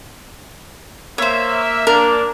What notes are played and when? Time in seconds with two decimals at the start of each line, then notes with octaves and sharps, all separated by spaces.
1.18 A#3 C5 C#5 E5
1.87 A#3 D4 A#4